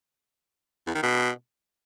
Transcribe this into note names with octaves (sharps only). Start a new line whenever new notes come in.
E2
D#3
B2